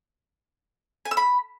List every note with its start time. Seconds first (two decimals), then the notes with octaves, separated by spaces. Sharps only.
1.05 G#5
1.11 E6
1.17 B5